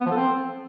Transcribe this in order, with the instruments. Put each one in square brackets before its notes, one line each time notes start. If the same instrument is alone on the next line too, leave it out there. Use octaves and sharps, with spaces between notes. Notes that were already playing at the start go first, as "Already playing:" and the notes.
[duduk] B3
F3
A4
C4